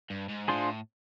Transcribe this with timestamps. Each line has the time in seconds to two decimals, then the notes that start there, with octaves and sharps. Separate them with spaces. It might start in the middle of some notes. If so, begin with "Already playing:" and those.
0.10 G2
0.29 G#2
0.48 A2 D4 F4 G#4 C5